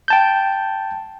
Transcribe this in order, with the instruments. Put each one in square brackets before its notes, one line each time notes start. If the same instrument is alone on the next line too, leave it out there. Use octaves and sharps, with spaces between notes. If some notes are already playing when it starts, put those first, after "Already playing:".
[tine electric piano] G5 A5 G6